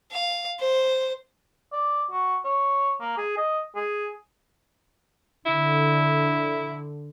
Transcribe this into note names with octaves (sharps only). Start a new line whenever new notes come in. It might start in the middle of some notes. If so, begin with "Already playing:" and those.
F5
C5
D5
F#4
C#5
A#3
G#4
D#5
G#4
D3 E4